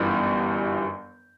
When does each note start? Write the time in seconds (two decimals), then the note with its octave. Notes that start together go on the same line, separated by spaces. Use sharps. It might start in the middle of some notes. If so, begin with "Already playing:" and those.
Already playing: G1 F#2 E3 G3